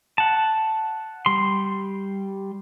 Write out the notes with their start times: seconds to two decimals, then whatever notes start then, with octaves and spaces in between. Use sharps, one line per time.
0.18 F#5 A5
1.26 G3 C6